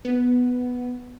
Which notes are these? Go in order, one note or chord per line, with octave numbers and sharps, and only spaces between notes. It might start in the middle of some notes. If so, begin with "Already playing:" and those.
B3